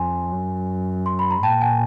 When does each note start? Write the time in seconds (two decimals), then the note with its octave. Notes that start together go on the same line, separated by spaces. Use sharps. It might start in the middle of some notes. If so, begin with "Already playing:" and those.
Already playing: F2 G#5 C6
0.32 F#2
1.06 C6
1.19 B5
1.31 A#5
1.43 A#2 G5 A5
1.61 F#5 G#5